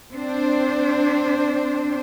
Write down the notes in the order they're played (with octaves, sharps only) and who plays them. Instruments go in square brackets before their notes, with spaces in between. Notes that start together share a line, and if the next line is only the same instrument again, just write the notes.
[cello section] C4 D4 C5